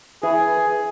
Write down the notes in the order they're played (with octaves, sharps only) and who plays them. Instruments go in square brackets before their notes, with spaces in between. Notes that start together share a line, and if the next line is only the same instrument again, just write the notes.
[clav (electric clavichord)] E3 [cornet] G#4